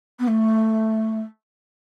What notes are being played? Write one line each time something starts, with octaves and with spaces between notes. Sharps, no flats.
B3
A3